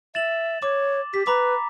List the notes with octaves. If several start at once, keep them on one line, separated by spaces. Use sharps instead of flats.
E5 A6 E7 F#7
C#5 D6
G4 B6
B4 A#5 B5 D6